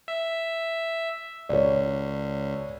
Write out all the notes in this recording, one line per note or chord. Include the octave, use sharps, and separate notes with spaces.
E5
C#2 C#5 D5